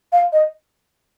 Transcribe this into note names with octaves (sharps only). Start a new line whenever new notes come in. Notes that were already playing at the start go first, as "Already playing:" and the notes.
F5
D#5